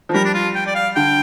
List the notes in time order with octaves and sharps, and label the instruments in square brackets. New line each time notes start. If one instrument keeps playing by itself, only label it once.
[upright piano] F3
[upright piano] G3 [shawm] A#4
[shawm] D4
F4
G5
D5
F5
[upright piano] D3 [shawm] G5